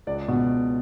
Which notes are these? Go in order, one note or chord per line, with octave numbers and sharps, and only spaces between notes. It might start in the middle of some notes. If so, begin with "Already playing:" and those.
C#2 D5
B2